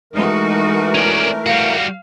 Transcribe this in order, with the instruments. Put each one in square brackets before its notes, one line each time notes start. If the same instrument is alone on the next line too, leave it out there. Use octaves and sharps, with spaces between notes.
[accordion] E3 A3 A#4 [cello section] G#3 D#4 F#4
[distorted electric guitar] C#4 D5
[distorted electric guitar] G3 F#4 [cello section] F5